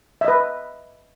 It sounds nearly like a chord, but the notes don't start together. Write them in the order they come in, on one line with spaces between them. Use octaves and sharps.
E5 D#5 B4